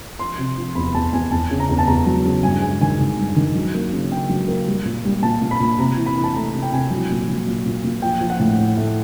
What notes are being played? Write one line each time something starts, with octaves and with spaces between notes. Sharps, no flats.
F3 C6
C3
F3
E2 B5
E2 A5
E2 G#5
E2 A5
C#3
A#5
E2
A5
E2 A#5
F#3
C#3
G2 G#5
G#3 G#5
D#3 G#5
D#3
G2
D#3
F#3
A#3
C#3
C#3 G5
F#3
A#3
G3
A#2
G3
A#2 A5
A#2
B5
A#2
C3 A#5
E3
B5
E3
A5
A3 A#5
C3
G5
C3 G#5
F#3
A#2
F#3
A#2
A#2
A#2
F3 G5
F3
F#5
A2
A2
A3